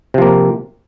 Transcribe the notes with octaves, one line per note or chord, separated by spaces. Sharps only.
C3 F3 A#3